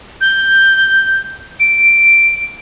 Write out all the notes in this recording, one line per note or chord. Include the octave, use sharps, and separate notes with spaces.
G6
D7